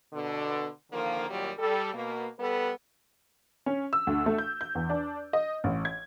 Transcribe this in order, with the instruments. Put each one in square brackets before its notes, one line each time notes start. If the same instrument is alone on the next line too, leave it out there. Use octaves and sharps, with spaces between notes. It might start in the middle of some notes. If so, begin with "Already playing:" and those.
[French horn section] B2 D3
D3 D#3 F3 A#3
D#2 A#2 F#3 G3
G3 A4
B2 A#3
G3 B3 A4 B4
[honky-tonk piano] C#4
E6
D2
A3
G6
G6
E2
D4
D#5
A1
G#6